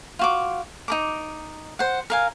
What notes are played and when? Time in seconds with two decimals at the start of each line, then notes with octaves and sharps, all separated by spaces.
0.19 F4 F#4 D6
0.88 D#4 A#4 D6
1.79 C5 F#5
2.10 A#4 F5 G#5